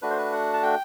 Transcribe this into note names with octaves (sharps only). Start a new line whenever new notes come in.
A3 D4 F#4 B4
C5
B4
F#5
A5
G5